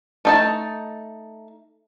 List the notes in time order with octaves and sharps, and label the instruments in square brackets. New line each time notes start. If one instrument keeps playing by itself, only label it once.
[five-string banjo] A3 D#4 A5